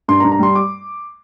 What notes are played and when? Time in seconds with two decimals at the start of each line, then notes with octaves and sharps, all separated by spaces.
0.08 G2 C6
0.20 A#5
0.24 G2
0.32 A#5
0.39 G3 C6
0.55 D6